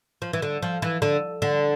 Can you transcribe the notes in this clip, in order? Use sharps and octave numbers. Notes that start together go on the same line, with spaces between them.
F3
E3
D3
F3
E3
D3
D3